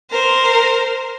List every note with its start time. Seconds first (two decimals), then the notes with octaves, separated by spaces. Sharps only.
0.11 A#4 C5